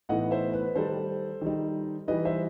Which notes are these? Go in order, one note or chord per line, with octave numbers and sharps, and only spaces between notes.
A2 E3 B3 D#4 D#5 F#5
C5 E5
B4
D#3 G3 D#4 A4 C5
D#3 G3 D#4
E3 G3 D#4 B4 D#5
C5 E5